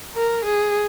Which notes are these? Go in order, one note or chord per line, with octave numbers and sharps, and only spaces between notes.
A#4
G#4